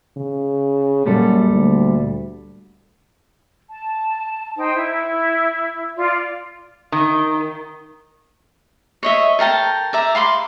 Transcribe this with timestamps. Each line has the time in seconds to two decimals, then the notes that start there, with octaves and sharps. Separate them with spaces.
0.17 C#3
1.06 F#2 A#2 G3 A4
1.51 D2
3.69 A5
4.57 D#4 C5 G5
4.76 E4
5.98 F4 D5
6.92 D#3
9.03 C#5 D#5 E5
9.39 A4 A#4 G5 A5
9.93 D5 E5 A#5
10.15 F5 B5 C6 D6